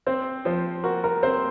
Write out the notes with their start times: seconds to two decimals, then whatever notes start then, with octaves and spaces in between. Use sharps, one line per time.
0.07 C4 C5
0.45 F3 C5
0.84 F#4 A#4
1.04 A#4
1.23 C4 C5